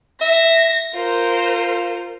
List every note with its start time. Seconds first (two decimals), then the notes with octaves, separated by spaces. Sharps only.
0.21 E5 A#6
0.95 F4 A#4 C5